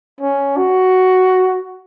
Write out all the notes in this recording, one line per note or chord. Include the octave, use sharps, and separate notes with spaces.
C#4
F#4